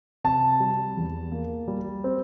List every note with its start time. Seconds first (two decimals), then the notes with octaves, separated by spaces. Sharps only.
0.24 C3 A5
0.60 G3
0.97 E2
1.32 A#3
1.68 G3
2.04 C4